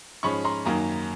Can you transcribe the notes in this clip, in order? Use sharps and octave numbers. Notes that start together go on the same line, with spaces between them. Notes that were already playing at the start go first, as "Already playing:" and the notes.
G#2 F3 G#3 C#4 B5 C#6
A#5 C6
F#2 D#3 F#3 A#3 G#5 A#5